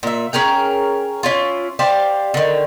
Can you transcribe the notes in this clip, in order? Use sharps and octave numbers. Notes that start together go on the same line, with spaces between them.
A#2 E5
C#4 G#4 A#4 G5
C#4 E4 F4
G4 C5 D5 F5
D3 D#3